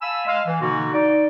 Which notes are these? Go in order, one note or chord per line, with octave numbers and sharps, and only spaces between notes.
F5 G#5 A5 B5 E6
G#3 D#5 F5
E3
B2 D3 A#3 D#4 F#4
D#4 D5